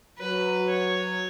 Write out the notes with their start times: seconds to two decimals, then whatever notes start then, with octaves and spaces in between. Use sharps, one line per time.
0.19 F#3 B4
0.69 C#5